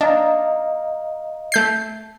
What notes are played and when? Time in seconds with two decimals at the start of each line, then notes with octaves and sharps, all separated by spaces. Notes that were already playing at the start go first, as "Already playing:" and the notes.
0.01 D4 D#5 F5 A#5
1.52 A3 G6 C7